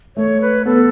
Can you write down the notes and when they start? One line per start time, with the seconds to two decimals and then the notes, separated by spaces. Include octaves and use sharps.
0.16 A3 C#5
0.41 B4
0.65 B3 A4